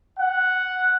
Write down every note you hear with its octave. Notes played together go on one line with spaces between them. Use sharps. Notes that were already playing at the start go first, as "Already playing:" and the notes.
F#5